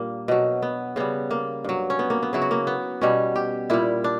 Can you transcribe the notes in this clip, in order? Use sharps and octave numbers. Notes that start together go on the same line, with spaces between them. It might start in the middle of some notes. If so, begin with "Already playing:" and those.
Already playing: A#2 G3 A#3 D4
B2 F#3
B3
C#3 G3 B3
A#3
G2 F#3
C#4
B3
A#3
B3
C#3 F#3 E4
F#4
A#3
B3
B2 G3 C#4
G4
A#2 G3 E4
D4